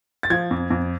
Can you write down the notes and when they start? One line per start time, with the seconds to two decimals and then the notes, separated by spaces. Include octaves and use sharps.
0.23 A6
0.30 F3 G#6
0.51 F2
0.70 F2